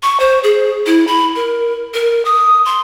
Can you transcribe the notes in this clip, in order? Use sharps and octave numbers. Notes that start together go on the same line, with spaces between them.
C#6
C5
G#4
E4
B5
A#4
A#4
D#6
C6